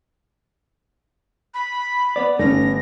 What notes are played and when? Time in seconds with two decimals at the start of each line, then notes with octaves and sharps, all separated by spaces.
1.54 B5
2.16 B3 D5
2.39 G1 A3 C#4 A#6